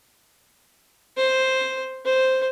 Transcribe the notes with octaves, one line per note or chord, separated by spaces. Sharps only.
C5
C5